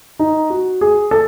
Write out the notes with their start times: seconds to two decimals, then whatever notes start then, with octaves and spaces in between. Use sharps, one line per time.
0.19 D#4
0.50 F#4
0.81 G#4
1.11 A4